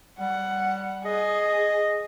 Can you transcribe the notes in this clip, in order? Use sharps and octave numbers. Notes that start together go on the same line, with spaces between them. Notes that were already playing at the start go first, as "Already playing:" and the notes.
G3 F#5
G#4 D#5